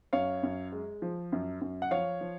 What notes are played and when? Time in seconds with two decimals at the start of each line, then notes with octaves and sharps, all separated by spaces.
0.13 F#2 C#5 F5
0.43 F#2
0.72 G#3
1.02 F3
1.32 F#2
1.61 F#2
1.82 F#5
1.91 F3 C#5 F5
2.21 F3